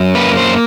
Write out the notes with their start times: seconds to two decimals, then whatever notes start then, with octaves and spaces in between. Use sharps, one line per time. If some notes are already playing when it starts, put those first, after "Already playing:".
Already playing: F#2 F#3
0.15 A#3 B4
0.37 C5